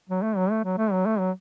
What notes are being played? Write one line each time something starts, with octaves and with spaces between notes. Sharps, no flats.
F#3
A3
F#3
A3
F#3
A3
F#3
A3
F#3